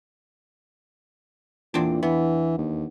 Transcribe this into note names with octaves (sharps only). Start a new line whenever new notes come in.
E2 A#2 C4 D4
E3 B3
D#2